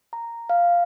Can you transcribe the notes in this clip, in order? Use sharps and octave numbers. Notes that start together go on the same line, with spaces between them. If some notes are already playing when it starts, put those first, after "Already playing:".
A#5
F5